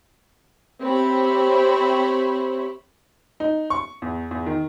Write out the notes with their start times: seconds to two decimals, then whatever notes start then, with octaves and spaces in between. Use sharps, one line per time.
0.84 C4 G4 C5 C#5 E5 B5
3.40 D#4
3.70 C#6
4.02 E2
4.31 E2
4.46 D#3